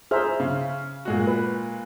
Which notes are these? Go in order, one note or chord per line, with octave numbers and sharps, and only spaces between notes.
G#4 C5 E5 A#5 F6
C#3
A#2 G#3 F#4
B4